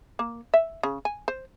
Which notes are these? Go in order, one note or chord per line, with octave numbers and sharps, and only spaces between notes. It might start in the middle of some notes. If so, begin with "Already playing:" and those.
A#3
E5
C#3
G#5
C5